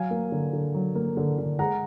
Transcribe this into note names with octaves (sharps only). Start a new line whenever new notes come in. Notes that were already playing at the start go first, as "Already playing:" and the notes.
Already playing: F#3 F5 G#5
A#3
D3
D3
F#3
A#3
D3
D3
G#3 F#5 A#5